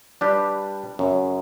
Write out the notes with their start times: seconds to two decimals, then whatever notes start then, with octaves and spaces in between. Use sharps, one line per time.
0.21 G3 D4 G4 B4
0.99 F#2 C#3 F#3